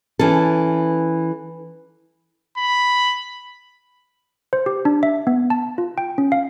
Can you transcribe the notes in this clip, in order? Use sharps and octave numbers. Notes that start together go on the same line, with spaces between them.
E3 C#4 A4
B5
C5
G4
D4
E5
B3
A5
F4
G5
C#4
F5